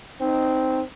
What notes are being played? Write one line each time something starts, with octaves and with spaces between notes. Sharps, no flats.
C4 D#4